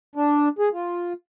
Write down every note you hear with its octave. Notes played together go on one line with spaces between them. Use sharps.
D4
G#4
F4